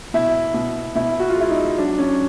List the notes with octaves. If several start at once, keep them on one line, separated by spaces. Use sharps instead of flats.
B2 E4
B2
B2 E4
F#4
F4
G#3 E4
D#4
F#3 D4
C#4